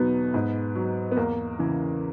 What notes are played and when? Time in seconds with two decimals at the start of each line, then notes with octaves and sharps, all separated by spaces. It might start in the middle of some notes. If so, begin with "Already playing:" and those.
Already playing: E2 B2 F#3 B3 D#4
0.34 G#2
0.75 F#3
1.11 B3
1.17 E2 A#3
1.59 C#3 E3